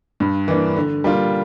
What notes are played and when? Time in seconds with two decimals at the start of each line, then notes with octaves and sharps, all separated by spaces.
0.20 G2
0.48 E3 A#3 D4
0.76 D3
1.04 G3 A#3 D4 F4